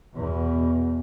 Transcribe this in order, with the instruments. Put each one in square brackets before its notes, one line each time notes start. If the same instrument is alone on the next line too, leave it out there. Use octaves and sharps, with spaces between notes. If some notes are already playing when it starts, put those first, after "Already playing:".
[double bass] E2 B2